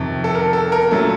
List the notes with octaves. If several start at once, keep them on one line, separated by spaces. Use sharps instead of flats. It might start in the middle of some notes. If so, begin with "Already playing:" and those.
Already playing: F2 C3 D#3
A4
A#4
A4
A#4
A#2 F#3 A3 A4